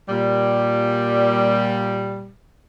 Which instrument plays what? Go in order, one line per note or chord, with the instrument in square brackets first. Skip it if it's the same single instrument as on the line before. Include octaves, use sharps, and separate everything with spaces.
[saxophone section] A#2 G3